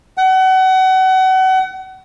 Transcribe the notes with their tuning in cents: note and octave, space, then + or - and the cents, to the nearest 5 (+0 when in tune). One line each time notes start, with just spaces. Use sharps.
F#5 +30